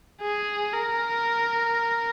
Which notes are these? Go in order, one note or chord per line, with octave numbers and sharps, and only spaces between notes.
G#4
A#4